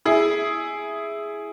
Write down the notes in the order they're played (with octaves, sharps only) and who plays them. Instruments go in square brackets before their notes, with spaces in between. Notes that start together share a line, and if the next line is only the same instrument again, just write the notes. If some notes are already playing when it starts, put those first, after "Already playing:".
[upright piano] E4 G#4